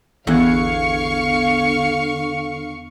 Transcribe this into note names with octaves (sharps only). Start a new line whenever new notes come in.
A1 E2 D3 B3 F5 F#5 C#6 G#6